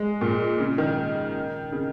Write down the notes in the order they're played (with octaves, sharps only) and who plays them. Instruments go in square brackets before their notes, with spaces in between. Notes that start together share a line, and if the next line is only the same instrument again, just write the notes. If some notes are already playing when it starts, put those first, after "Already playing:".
Already playing: [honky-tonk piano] G#3
A#2
C#3
D#3
C#3